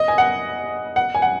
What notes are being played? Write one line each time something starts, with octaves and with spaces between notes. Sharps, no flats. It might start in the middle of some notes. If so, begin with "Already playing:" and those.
Already playing: D#5
G#5
F#5
F#5
G#5
F#5